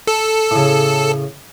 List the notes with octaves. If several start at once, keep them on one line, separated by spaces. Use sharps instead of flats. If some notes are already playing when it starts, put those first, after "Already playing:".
A4
A2 C#3